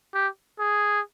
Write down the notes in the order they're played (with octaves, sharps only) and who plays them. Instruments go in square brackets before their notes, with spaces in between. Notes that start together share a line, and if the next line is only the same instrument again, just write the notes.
[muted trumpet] G4
G#4